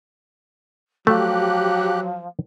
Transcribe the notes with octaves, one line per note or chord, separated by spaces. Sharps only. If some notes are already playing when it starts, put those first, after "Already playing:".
F3 F#3 A3 G4 F#6